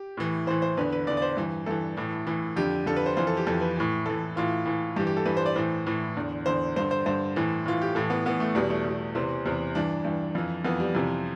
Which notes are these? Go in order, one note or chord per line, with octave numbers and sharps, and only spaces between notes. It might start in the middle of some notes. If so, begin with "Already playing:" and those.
Already playing: G4
A2 E3
A2 E3 C5
C5
E2 D3 B4
B4
E2 D3 D5
D5
C5
G2 E3
G2 E3 A4
A2 E3
A2 E3
F2 D3 G4
F2 D3 A4
B4
C5
F2 E3 C5
A4
G4
F2 E3 A4
B4
A2 E3
A2 E3 A4
A2 E3 F4
A2 E3
G2 E3 G4
G4
A4
G2 E3 B4
C5
D5
A2 E3 C5
A2 E3
E2 D3
E2 D3 C5
G2 D3 C5
C5
G2 D3 C5
A2 E3
A2 E3 F4
G4
A2 E3 A4
B3
A2 E3 B3
A3
E2 B2 G3
A3
E2 B2
E2 C3 E3 C4
E2 C3 E3
G2 E3 D4
G2 E3
F2 E3
F2 E3 B3
G3
F2 C3 E3